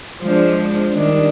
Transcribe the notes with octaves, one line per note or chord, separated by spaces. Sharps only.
F3 G#3 D4
D#3 G3 D4